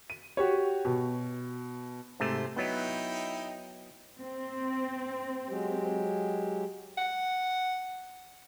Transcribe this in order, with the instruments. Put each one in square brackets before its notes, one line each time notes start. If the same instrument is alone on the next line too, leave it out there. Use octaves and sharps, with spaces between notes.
[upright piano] D#7
F#4 G4 C#5
B2
[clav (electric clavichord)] G#2 C3 A3 [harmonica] C5
[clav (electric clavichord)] F#3 B3 [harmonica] D#4 E4 G5
[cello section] C4
[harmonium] F#3 G#3 G4
[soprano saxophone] F#5